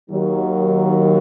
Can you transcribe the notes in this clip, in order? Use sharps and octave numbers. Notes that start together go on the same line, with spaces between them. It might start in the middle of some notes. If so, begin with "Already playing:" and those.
D#2 D#3 F#3